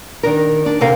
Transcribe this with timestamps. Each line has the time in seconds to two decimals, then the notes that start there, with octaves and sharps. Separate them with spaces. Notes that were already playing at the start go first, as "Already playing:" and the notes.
0.23 D#3 D4 A#4
0.66 D4
0.81 D#2 C3 A4 A#4 F5